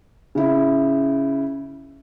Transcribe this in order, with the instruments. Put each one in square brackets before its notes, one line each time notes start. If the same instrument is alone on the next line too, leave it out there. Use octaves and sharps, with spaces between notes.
[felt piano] C#3 E4